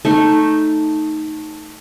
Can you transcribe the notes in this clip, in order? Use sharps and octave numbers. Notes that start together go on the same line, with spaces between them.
A3 D#4